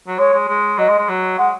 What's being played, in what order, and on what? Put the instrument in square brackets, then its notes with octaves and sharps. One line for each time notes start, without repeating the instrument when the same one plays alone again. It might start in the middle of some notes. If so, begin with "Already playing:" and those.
[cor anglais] F#3
[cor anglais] G#3 [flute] C#5
[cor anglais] G#3
G#3
[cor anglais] F#3 [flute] D#5
[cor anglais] G#3
G#3
F#3
[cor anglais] G#3 [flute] F#5